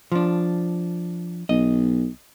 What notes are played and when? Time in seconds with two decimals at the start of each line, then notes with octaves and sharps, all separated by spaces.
0.12 F3 D4
1.49 B1 D#5